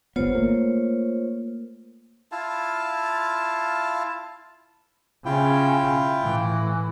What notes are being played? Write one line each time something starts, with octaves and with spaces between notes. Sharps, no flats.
G1 B3 F4 C5 C#5
A3 A#3
E4 F4 F5 A5
C#3 C#4 E4 F4 G5
A2 E3